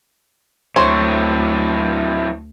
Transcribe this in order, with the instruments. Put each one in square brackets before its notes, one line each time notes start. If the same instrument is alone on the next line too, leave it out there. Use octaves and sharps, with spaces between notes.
[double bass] D2 [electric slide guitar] A2 F#3 C4 [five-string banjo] C5 C#5